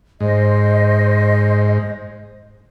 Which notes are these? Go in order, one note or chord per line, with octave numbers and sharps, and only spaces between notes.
G#2 C5 D#5